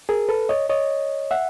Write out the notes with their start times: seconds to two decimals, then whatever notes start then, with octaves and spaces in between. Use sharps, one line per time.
0.09 G#4 A#4
0.29 A4 B4
0.49 C#5 D#5
0.69 C#5 D#5
1.31 E5 F#5